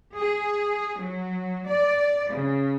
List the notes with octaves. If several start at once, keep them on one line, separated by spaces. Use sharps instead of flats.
G#4
F#3
D5
C#3